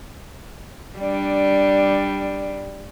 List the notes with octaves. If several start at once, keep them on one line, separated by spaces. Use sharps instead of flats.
G3 D4